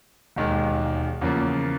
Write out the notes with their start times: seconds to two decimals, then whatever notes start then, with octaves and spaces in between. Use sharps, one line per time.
0.36 E1 D#2 D#3 G#3
1.21 E2 C#3 F3 A#3